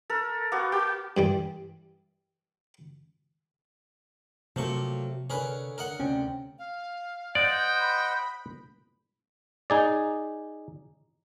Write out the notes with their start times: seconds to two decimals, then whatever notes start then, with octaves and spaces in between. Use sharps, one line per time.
0.10 A4 A#4
0.52 A#3 B3 F#4
0.72 F#4
1.17 G2 E3 G3
4.56 C3 F3 F#3 A3 A#3 G4 C#6
5.30 D3 G#4 A#4 B4 C#5
5.78 A#4 D#5 F#5
6.00 D2 C3 C#4 G5
6.59 F5
7.35 C5 D5 D#5 F#5 G5
7.79 B5
9.70 D#4 G#4 D5